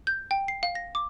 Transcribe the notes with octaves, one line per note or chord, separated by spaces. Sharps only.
G6
G5
C7
F5
A#6
D6